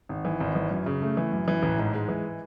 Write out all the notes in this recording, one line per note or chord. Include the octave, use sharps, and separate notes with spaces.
G#1
E3
G#1
E3
F#2
C#3
A3
E3
F#2
E3
A1
G#2
G#3
E3